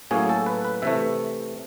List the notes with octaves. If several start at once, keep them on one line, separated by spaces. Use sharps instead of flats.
A2 F#3 A#3 C#4 G#4
A4
B4
B4
C3 E3 A3 E5